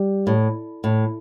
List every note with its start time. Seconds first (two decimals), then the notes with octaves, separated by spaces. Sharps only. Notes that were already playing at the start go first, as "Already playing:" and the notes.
Already playing: G3
0.27 A2
0.84 A2